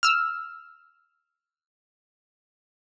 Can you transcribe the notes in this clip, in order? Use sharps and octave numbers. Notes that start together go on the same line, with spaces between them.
E6 F6